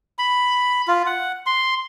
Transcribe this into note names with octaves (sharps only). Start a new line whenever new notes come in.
B5
F4
F#5
C6